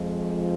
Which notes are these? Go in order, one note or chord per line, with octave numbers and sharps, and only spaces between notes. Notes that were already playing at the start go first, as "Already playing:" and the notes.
Already playing: F2 F3 G#3